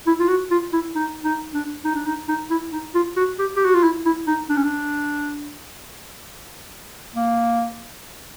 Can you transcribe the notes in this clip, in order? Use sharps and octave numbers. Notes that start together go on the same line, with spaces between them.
E4
F4
F#4
F4
E4
D#4
D#4
D4
D#4
D4
D#4
D#4
E4
D#4
F4
F#4
G4
G4
F#4
F4
E4
E4
D#4
D4
C#4
D4
A#3